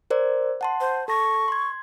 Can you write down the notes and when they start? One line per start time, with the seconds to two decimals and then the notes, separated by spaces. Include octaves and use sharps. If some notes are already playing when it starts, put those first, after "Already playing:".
0.10 A#4 C5 D5
0.61 F#5 A5 C6
0.81 C5
1.08 A4 A5 C#6 A#6
1.48 C6 G#6